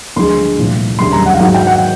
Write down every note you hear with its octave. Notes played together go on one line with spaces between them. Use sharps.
D2 D3 F3 G#3 C6
C2 A#2 F3 A3
E1 D2 C#3 E3 G3 C6
A#5
F#5
F5
G#2 D#3 F#3 F#5
G5
F#5